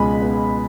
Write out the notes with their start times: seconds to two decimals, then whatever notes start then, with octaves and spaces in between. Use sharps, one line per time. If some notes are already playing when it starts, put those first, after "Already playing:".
Already playing: C#2 B2 G#3 G#5 B5
0.22 B3